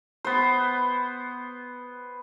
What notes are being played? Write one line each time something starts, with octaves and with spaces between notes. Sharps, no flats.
B3 C5